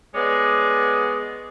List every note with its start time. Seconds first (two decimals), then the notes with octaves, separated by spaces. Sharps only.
0.15 G#3 B3 G#4 C#5 D5